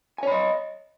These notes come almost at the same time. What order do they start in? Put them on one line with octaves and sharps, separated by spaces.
G#5 C#5 B5 D#5